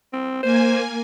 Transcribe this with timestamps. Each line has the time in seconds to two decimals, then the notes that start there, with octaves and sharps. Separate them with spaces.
0.13 C4
0.43 A#3 C5 G#5